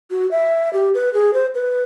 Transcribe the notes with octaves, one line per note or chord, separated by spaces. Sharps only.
F#4
E5
G4
B4
G#4
C5
B4